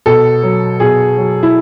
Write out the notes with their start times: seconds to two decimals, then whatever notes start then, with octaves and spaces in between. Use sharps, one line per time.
0.06 B2 A4
0.43 F#3
0.80 B2 G#4
1.17 F#3
1.43 E4